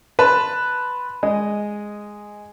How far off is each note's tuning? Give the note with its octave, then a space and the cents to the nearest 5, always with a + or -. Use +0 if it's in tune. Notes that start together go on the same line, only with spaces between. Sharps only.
B4 +0 A5 +5 C6 +0
G#3 +0 D#5 +0